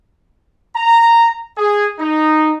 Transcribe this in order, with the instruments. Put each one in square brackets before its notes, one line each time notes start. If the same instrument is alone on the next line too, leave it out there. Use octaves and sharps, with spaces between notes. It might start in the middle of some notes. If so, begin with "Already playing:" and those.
[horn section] A#5
G#4
D#4